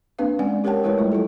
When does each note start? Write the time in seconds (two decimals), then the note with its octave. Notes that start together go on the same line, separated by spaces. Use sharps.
0.19 A#3 C4 D4 B4 F5
0.39 G#3 C4 C#4 D5 F#5 G#5
0.64 G4 A#4 C#5 F#5 G5 A5
0.84 G#3 A3 E4 A#4 B4 C#5
0.98 G3 F4
1.12 F#3 E4 F4 A4